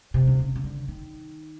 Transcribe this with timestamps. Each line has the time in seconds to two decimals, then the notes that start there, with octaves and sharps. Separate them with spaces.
0.14 C3
0.27 D3
0.39 C#3
0.56 C#3
0.64 D3
0.88 D#3